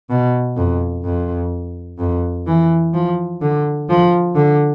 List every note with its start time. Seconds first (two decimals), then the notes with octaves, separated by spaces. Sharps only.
0.10 B2
0.57 F2
1.05 F2
1.99 F2
2.47 E3
2.94 F3
3.42 D3
3.89 F3
4.36 D3